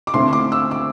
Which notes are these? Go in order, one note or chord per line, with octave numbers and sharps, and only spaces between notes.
D6
D3 A3 C4 E4 C6
D6
E6
D6